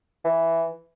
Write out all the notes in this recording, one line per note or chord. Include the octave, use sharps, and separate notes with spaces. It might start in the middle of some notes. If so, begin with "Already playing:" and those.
E3